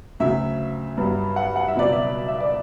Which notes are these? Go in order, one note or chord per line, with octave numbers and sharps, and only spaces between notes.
D2 C#3 F#3 E5
G2 F#3
F#5
F#5
E5
C#2 B2 F#3 D5
E5
E5
D5